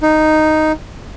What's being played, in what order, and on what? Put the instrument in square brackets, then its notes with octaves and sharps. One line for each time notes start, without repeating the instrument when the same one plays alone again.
[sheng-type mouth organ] D#4